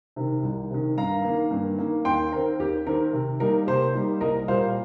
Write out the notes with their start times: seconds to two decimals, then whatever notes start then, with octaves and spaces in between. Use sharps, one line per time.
0.16 C3 D#3
0.43 C2
0.70 C3 D#3
0.97 G2 F5 A#5
1.24 D#3 A#3
1.51 G2
1.78 D#3 A#3
2.05 D#2 G5 C6
2.32 D#3 C4 A#4
2.59 D#2 G4
2.87 D#3 C4 A#4
3.13 C3
3.40 G3 A#3 D#4 A#4
3.67 C3 G4 C5
3.94 G3 A#3 D#4
4.21 C2 A#4 D#5
4.48 A#2 G3 A#3 C5 F5